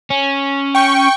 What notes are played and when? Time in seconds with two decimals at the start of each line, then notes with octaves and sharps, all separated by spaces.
0.10 C#4
0.75 G5 C#6